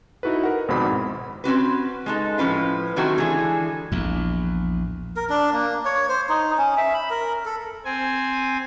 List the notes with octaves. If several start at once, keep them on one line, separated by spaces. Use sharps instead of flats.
D#4 E4 F#4 A4 B4
A#4 F#5
G#1 F2 G#2 B2 C5 B5
C4 C#4 F#4 B4
G#3 D#4 A4
A2 F3 C#4 B4 F5
D#3 F#3 A3 C4 F#4 A4
D3 E3 G#3 G#4 A4
A#1 E2
A#4
D4
A#3
C#5
C5
D#4
C#4
E5
B5
A#4
A4
C4 G#5